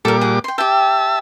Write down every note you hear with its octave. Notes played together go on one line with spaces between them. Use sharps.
A#2 G3 A4 A#4 D6
G#4 F#5
G5 C6
G4 E5 G5 A5 E6